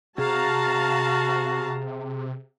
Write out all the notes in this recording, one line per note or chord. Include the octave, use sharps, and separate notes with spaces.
C3 F#4 G#4 F5 A5 A#5